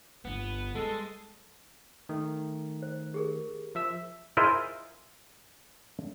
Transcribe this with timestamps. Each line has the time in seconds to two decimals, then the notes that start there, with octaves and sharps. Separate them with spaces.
0.25 G1 G2 B3
0.75 G3 G#3 A4
2.09 D#3 A3
2.82 C5
3.14 G4 G#4 A#4
3.75 F3 E5 E6
4.37 E4 F4 G#4 A#4 C5 D#5